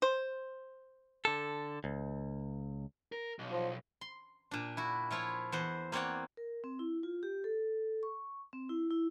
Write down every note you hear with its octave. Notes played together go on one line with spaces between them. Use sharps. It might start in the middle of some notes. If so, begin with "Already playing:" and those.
C5
D3 A4
C#2
A#4
B1
F3
C6
A#2 D4
E4 F#4
F3 E4 F4 C#5
E2 C5 F#5
A#3 C4 C#5 D5 F#5
A#4
C4
E4
F4
G4
A4
C#6
C4
E4
E4